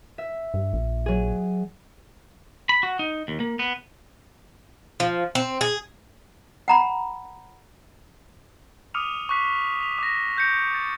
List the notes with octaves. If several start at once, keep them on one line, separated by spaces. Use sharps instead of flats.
E5
G2
A#1
F#3 G#4
B5
F#4
D#4
D#2
A#3
B3
F3
C4
G#4
F#5 A#5 B5
D6 D#6 F6 C#7 D#7 F7
C#6 D6 F#6 B6 C7
B6 F7
D6 A#6
F#6 G6 A#6 C#7 D7
A6